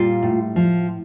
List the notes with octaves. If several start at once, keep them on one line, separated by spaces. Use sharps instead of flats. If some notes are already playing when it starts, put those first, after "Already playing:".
Already playing: A#2 G3 F4
A2
F3